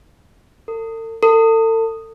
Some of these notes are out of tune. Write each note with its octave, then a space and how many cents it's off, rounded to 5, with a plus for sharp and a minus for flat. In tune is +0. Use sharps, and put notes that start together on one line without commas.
A4 +45
A4 +40